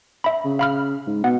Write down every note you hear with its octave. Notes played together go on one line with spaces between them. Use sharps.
E5 B5
C#3
F5 B5 F6
G#2
B2 F#5